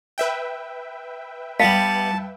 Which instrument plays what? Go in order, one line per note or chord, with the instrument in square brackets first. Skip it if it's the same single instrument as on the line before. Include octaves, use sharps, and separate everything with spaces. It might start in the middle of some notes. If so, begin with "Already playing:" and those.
[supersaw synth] B4 E5 G5
[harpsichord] G3 B3 [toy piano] F5 [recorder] A5